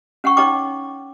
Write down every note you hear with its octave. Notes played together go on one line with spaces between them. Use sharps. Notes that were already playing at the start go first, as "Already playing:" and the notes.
C#4 F#5 G5 C#6
D#4 C#5 G5 D6